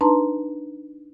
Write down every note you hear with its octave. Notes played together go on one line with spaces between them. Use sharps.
D4 D#4 B4 A5 A#5 C6